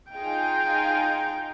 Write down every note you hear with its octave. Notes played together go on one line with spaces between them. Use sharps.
D#4 F4 G#4 G5